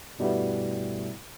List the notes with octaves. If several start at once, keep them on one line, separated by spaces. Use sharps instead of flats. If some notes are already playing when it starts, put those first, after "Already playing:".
G2 B2 G3 A3 B3 E4